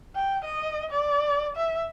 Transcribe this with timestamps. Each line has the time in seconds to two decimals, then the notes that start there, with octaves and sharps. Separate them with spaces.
0.15 G5
0.44 D#5
0.91 D5
1.56 E5